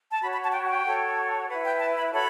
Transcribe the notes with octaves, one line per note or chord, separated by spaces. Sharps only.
A5
F#4 C#5 B5
B5
A5
G5
G5
F#4 A4 C#5
E4 B4 F#5
G5
A5
B5
F#4 A4 C#5 B5